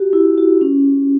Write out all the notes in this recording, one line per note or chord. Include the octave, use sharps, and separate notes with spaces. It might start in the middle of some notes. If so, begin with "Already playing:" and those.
Already playing: F#4 G4
E4
F#4
C#4